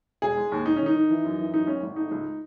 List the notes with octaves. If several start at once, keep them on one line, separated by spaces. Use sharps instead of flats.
E1 G#4
G#3
D#2
E1 D#4
D#3 C#4
D#4
D#3
E3
F#2
E3
F#2 D#4
G#1 C#4
G#1
A3 D#4
C#2